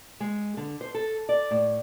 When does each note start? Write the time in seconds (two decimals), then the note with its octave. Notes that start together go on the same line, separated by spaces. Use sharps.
0.20 G#3
0.57 D3
0.81 C5
0.95 A4
1.29 D5
1.51 A2